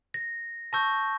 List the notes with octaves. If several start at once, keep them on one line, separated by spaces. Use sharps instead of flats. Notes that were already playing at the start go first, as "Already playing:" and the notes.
A#6
A5 C#6 E6 G6 A#6